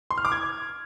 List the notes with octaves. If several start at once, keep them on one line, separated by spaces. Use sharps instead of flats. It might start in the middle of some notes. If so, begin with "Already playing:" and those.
C6
F6
D6
G#6